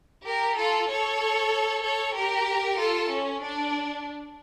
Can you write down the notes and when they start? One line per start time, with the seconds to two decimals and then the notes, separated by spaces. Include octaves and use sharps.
0.26 G4 A#4
0.58 F4 A4
0.90 A4 C#5
1.84 A4 C#5
2.16 G4 A#4
2.79 F4 A4
3.11 C#4
3.43 D4